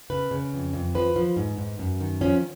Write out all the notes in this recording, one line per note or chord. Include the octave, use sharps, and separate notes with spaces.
C#3 B4
C#3
F2
F2
F3 B4
F3
G#2
G#2
F#2
D#3
F3 C#4